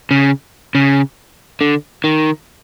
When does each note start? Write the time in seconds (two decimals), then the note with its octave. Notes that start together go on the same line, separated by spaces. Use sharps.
0.11 C#3
0.75 C#3
1.61 D3
2.04 D#3